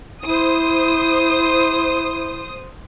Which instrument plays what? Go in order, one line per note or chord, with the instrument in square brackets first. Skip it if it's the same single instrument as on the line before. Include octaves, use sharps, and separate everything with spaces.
[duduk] E4 [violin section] C5 D#6